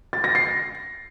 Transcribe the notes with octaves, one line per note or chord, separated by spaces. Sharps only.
A6
A#6
C7